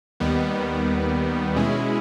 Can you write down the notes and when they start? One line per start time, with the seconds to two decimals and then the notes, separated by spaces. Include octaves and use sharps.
0.20 D#2 D#3 G3 B3
1.56 B2 G#3 C#4 E4 G#4